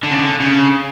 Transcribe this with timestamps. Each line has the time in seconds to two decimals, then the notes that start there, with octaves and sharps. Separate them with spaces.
0.03 D3
0.11 C#3
0.19 D3
0.40 C#3